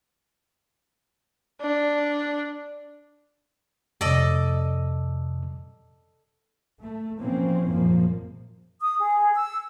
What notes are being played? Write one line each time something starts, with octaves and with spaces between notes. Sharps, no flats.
D4
F2 C3 A4 D5 D#5
A3
B2 E3 F3 A#3 C4 C#4
G#1 F#2 A#2 F3 A#3
D#6
G#4
E6